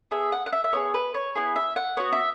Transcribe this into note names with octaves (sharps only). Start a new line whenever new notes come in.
B3 G#4 E5
F#5
F#5
E5
E5
B3 E4 G#4 C#5
B4
C#5
B3 E4 G#4
E5
F#5
B3 F#4 C#5
E5